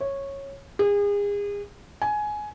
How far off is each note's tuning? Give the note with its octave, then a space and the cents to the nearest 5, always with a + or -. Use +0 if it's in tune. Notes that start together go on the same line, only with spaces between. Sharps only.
C#5 -10
G#4 -35
G#5 +15